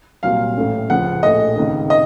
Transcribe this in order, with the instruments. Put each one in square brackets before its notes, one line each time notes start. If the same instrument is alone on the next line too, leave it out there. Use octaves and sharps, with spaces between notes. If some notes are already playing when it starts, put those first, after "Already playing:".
[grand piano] C2 A#2 F#3 [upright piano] F5
[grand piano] A1 A2 A3 C#4
[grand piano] C#2 C#3 F3 [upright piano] F#5
[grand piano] A#1 A2 A3 [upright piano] D#5
[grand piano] C#2 C3 D#3
[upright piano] D#5